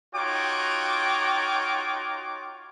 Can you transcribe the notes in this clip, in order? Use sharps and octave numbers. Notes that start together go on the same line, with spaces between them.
D#4 F4 F#4 C#5 G5 D6